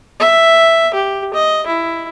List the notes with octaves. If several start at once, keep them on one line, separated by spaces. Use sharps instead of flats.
E5
G4
D#5
E4